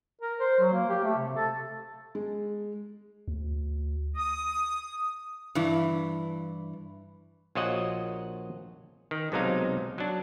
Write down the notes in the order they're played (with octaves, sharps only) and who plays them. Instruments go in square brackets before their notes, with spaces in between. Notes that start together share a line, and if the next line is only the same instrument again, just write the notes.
[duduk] A#4
C5
F#3
A#3
G4
A3
C3
A4
[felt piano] G#3
[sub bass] D2
[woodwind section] D#6
[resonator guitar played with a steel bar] G2 E3
[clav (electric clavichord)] A#1 F4 F#4 C#5 D#5 F#5
D#3
B1 C3 F#3 G#3 D#4 F5
F#3 D4